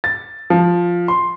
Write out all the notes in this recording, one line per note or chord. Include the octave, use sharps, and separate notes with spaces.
A6
F3
C6